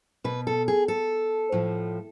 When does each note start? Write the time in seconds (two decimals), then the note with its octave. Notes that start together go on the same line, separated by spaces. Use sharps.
0.24 B2 B4
0.47 A4
0.68 G#4
0.88 A4
1.52 A2 F3